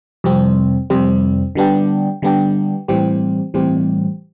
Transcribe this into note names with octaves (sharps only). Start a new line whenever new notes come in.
F2 C3 G3 C4
F2 C3 G3 C4
D3 G3 B3 D4 G4
D3 G3 B3 D4 G4
A2 E3 G3 C4 G4
A2 E3 G3 C4 G4